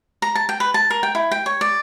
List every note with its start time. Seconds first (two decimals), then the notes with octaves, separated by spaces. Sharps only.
0.22 A#5
0.35 A5
0.49 G5
0.60 B4
0.74 A5
0.90 A#4
1.03 G5
1.15 E4
1.31 G5
1.46 C#5
1.61 D5